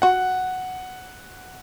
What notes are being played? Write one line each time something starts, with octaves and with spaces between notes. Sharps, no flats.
F#4 F#5